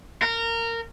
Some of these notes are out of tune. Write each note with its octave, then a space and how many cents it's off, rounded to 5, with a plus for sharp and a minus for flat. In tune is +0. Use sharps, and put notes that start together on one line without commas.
A#4 -20